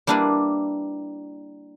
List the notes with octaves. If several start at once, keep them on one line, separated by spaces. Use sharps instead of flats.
G3 A#3 D4 E4 B4